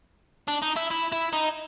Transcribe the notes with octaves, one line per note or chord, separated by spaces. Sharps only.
D4
D#4
E4
E4
E4
D#4